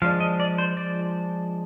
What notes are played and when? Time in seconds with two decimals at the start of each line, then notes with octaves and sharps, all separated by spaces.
0.02 F3 G#3 D4 F5
0.20 D#5
0.40 D5
0.58 C5
0.77 D5